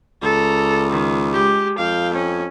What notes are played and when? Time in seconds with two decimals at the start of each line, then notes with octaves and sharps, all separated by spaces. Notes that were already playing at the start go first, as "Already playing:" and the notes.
0.22 C#2 A4 A#5
0.92 D#3
1.33 G#3 G4
1.79 F2 F5 G5
2.14 C#4